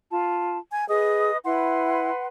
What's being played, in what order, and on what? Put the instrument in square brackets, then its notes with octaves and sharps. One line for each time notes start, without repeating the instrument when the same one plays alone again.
[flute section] F4 A5
[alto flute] G#5 [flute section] G#6
[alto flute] G#4 [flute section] B4 D#5 D#6
[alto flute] E4 [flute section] B4 F#5 C6